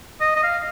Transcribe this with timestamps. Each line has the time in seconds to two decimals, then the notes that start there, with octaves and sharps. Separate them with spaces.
0.21 D#5
0.36 D#5
0.43 F5